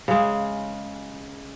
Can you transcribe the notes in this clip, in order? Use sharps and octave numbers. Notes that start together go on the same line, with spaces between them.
C#3 G#3